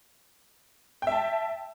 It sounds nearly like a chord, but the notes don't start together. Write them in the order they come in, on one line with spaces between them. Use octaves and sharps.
G5 E5 A5